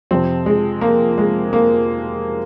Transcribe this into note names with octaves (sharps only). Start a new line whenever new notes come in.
F2 C3 F3 C4
G#3
A#3
G#3
A#3